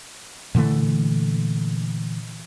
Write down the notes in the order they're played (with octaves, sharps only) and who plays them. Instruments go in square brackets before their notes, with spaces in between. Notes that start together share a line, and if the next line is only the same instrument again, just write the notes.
[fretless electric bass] A#2 D3 E3 A3